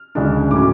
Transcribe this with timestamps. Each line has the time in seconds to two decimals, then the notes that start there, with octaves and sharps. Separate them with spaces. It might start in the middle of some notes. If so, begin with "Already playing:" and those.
Already playing: F6
0.15 D2 C#3 G#3 D4
0.51 A2 F#3 C#4 D6